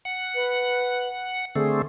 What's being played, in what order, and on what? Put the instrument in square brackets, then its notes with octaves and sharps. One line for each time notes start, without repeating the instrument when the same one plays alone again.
[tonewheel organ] F#5
[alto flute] B4
[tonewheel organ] D3 A3 C4 [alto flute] G#4